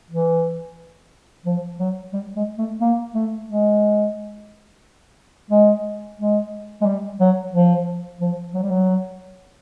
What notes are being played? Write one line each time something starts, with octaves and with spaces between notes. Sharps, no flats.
E3
F3
F#3
G3
G#3
A3
A#3
A3
G#3
G#3
G#3
G#3
G3
F#3
F3
F3
F#3
G3
F#3